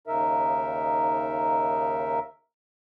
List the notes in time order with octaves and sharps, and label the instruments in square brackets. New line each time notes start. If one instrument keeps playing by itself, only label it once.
[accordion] D#2 C#3 D#4 A#4 E5